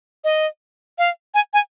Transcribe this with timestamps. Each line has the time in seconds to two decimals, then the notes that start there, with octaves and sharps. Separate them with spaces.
0.24 D#5
0.98 F5
1.34 G#5
1.54 G#5